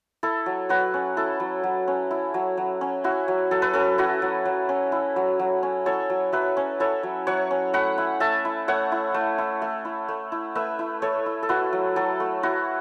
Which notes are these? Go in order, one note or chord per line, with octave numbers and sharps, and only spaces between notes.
E4 A4
F#3
F#3 F#4 B4
C#4
E4 A4
F#3
F#3
C#4
E4
F#3
F#3
C#4
E4 F#4
F#3
F#3 A4
B4
C#4 A4
E4 F#4
F#3
F#3
C#4
E4
F#3
F#3
C#4
E4 A4 C#5
F#3
F#3 B4 E5
C#4
E4 A4 C#5
F#3
F#3 C#5 F#5
C#4
A3 F#5 B5
E4
A3 E5 A5
E4
A3 C#5 F#5
E4
A3
E4
A3
E4
A3
E4
A3 B4 E5
E4
A3 A4 C#5
E4
A4
E4 F#4 B4
F#3
F#3 A4
A3
E4 F#4